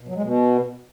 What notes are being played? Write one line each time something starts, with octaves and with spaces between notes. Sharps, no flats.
B2
F#3
G#3
B2